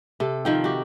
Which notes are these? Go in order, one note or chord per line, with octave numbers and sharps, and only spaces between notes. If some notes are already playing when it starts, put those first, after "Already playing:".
C3 A4
D#3 F3 G5
F#4 G4